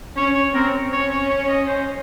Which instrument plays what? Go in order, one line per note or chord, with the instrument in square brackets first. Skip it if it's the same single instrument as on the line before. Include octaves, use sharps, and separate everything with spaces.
[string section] C#4 [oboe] C#5
[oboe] C#5
[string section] C4 [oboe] A#4
[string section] C#4 [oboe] C#5
[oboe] C#5
C#5
D#5
C5